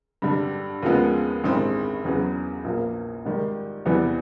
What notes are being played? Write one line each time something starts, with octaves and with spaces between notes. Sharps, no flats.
G2 D3 G3
D#2 C#3 F3 G#3 B3
A1 G2 D#3 G#3 C4
E2 C#3 F#3 B3
A#1 A#2 F3 A#3
G#2 D#3 G3
E2 C3 E3 G3 B3